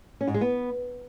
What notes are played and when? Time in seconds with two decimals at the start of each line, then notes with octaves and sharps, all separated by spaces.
0.21 C#4
0.27 G#2
0.34 G#3
0.41 B3